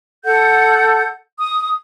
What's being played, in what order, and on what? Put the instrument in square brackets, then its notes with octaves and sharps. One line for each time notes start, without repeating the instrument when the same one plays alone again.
[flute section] A4 F#5 G6
D#6